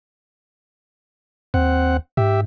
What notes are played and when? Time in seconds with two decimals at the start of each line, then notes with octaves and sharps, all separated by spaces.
1.54 D#2 C4 F#5
2.17 G#2 G4 E5